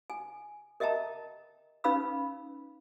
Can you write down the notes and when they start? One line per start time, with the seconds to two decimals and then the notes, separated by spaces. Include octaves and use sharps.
0.10 G#5
0.80 A#4 D#5 E5 G5 A5 A#5
1.84 C#4 D#4 B4 F5 B5 E6